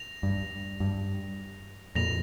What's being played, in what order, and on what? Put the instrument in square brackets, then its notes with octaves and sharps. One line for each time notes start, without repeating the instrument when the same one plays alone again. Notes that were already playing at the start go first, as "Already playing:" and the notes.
Already playing: [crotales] A#6 F7
[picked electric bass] G2
G2
[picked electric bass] F2 A#2 [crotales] A#6 F7